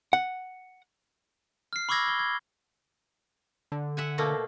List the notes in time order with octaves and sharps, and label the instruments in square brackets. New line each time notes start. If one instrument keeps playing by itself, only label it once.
[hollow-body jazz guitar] F#5
[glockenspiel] F6 C7
B5 C#6 D6 E6 G#6 A#6
G#6 G7
G#6
[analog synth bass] D3
[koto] E5 F#5 G#5
B2 A3 A#3